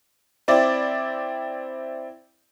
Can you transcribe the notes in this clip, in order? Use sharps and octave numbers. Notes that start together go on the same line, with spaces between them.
C4 E4 D5